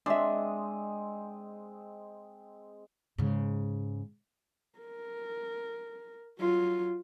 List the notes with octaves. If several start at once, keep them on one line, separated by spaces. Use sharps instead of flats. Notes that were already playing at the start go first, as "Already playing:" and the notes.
G#3 C4 D4 D#5 E5
G#2 C#3
A#4
F#3 F4